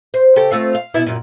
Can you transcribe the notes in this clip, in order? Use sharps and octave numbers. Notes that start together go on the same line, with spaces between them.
C5
C#3 G4 A4
A3 C4 F4
F5
B2 B3 E4
F#2 A#2